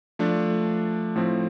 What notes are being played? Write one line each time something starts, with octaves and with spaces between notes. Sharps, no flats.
F3 A3 D4
A2 F3 C4